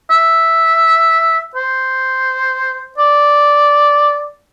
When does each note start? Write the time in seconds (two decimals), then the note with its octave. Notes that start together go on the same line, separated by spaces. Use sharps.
0.11 E5
1.55 C5
2.98 D5